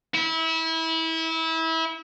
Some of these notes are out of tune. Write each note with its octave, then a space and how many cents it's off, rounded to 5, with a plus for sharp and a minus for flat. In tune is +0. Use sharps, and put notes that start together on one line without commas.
E4 -25